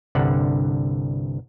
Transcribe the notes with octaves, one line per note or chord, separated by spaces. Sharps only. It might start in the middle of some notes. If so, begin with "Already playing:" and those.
C2 G2 D3 F#5